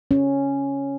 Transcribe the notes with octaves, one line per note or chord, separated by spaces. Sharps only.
C#4